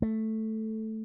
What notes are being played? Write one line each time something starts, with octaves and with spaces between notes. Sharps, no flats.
A3